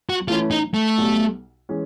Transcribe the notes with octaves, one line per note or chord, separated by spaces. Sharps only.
F#4
A2 E3 A3 C#4 E4 F4
D#4
A3
B1 B2 G3
E3 G#3 C#4